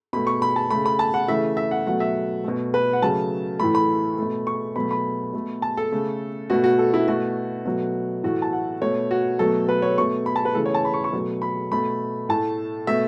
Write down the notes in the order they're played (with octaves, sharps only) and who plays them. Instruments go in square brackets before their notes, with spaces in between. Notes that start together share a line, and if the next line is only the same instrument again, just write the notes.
[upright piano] B2 A3 B5
C#6
B5
A5
C#3 A3 B5
B5
A5
F#5
C#3 E3 A3 E5
E5
F#5
B2 F#3 A3 F#5
E5
B2 A3
B4
F#5
C#3 F#3 A3 A5
A2 E3 A3 B5
B5
B2 A3
C#6
B2 F#3 A3 B5
B5
B2 A3
A5
A4
C#3 A3
B2 A3 F#4
F#4
A4
E4
B2 A3 F#4
B2 F#3 A3
A2 E3 A3 F#4
A5
F#5
B2 A3 C#5
F#4
B2 F#3 A3 A4
B4
C#5
B2 A3 C#6
B5
A5
B4
C#3 E3 A3 A4
C#5
A5
B5
C#6
C#6
B2 F#3 A3
B5
B2 A3 B5
A2 A3 A5
B2 A3 E5